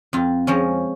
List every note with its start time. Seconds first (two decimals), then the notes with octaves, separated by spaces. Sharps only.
0.13 F2 F4
0.47 F3 G#3 C#4